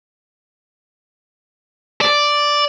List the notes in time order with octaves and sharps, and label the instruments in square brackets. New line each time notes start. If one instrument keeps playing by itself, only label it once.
[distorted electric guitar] D5